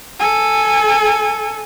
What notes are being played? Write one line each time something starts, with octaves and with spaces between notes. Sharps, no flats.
A4 G#5